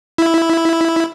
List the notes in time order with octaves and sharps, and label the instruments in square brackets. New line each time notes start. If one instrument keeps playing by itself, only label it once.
[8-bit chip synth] E4